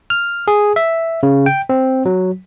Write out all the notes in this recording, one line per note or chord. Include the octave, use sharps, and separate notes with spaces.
F6
G#4
E5
C#3
G5
C4
F#3